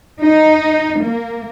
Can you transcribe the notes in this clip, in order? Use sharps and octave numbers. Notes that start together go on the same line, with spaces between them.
D#4
A#3